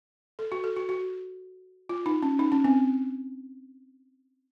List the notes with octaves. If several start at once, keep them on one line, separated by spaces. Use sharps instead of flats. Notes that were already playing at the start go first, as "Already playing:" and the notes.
A4
F#4
A4
F#4
F#4
F4
D#4
C#4
D#4
C#4
C4